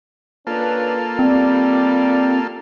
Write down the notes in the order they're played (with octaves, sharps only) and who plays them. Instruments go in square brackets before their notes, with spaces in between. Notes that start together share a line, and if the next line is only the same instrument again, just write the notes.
[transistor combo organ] A#3 F4 A4 [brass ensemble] C#4 D4 B4
[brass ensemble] G3 D5 [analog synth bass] C4